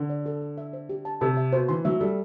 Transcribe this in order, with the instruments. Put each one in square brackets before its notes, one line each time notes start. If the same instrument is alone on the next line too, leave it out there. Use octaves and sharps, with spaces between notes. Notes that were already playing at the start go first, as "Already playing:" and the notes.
Already playing: [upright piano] D3 [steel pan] F#5
[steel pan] D5
A4
A4
E5
C5
G4
A5
[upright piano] C3 [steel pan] A5
[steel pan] E5
[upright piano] B2 [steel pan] C5
[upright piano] E3 [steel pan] C6
[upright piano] F#3 [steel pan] E5
[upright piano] G3 [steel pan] A4